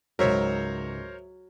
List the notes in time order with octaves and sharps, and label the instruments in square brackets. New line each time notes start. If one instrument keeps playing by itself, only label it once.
[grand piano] C#2 G#2 [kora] F#3 E5 [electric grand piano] A#4 C5 C#5